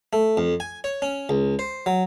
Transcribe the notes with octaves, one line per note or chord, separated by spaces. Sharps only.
A3
F2
G#5
C#5
C#4
C#2
C5
F#3